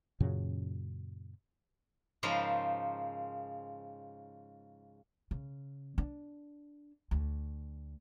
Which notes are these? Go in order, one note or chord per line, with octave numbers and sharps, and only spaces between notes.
F#2 A#2 C#3 F#3
G#2 C#3 F3 A#4 C5 B5
C#3
D4
D2